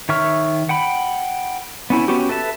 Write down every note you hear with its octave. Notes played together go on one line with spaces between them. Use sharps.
D#3 C#5 E5 C#6 F6
F#5 G5 B5
B3 C#4 E4
B3 C#4 F#4 G4
A4 B4 E5 A5